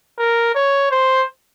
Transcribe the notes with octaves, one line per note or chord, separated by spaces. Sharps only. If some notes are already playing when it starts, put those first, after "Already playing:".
A#4
C#5
C5